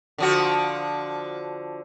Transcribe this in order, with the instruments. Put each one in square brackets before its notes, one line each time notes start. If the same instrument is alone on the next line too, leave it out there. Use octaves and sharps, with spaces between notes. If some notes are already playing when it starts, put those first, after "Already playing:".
[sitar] D3 F3 F#4